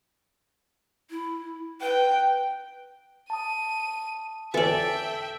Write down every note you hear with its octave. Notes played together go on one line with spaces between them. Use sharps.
E4
B4 G5
A5 D#6 D#7
E3 C#4 A4 D5 E5 G5